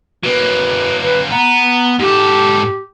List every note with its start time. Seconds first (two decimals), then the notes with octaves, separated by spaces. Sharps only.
0.24 F#3 A#3 B4
1.01 B4
1.30 B3 A#5
1.99 G#2 G4 A4